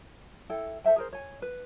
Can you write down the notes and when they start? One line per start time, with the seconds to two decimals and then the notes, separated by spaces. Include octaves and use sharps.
0.50 E4 A4 G5
0.84 A4 C5 E5 G5
0.96 G#4 A#4 C5
1.13 C#5 G#5
1.42 B4